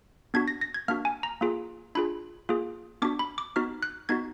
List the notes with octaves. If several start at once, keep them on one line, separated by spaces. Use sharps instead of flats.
B3 D4 F#4 G#6
A#6
A#6
G#6
A#3 D4 F#4 F6
G#5
A#5
A#3 F4 G#4
D4 F4 G#4 B5
A#3 F4 G#4
B3 D4 F#4 D6
B5
D6
B3 D#4 F#4 F6
F#6
B3 D#4 F#4 G#6